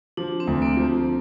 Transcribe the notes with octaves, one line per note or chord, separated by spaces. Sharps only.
F3 D4
C4
D2
A#3
F3